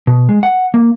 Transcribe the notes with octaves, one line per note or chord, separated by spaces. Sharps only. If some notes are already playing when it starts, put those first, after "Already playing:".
B2
G#3
F#5
A#3